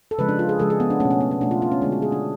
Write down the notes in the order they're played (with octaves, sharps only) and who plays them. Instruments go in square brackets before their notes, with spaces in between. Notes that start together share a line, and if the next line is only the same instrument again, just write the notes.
[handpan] A4
C#3 F3 G#3 B4
D4
F4
G#4
C#3 F3 G#3 A4
G#4
B3
D4
A3 C#4
B2
C#4
B3
C#4
B2 A3 D4
F4
F4
C#4
D3 G#3 D4
F#4
G#4
D4